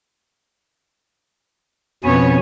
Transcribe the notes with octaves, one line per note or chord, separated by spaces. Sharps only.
F2 B2 B3 C#4 C#5 G#5